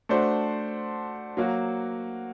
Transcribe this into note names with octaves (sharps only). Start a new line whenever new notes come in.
A3 D4 F#4 C5
F#3 A#3 F#4